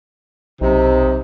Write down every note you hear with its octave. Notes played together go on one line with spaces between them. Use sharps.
B1 C3 D#4